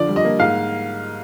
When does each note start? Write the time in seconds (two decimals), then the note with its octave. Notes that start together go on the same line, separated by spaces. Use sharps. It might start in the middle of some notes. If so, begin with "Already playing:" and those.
Already playing: D3 F3 D5
0.08 G3
0.16 D#5
0.25 A#3
0.39 G#2 F5